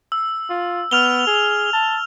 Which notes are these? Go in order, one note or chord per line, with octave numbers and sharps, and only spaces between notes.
E6
F4
B3 F6 F7 G7
G#4
A5